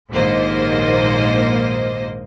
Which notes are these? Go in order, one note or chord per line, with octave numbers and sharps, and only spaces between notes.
A#1 D#2 G#2 A#3 C5 D#5